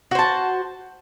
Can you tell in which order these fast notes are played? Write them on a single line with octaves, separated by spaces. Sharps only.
F#4 C5 A5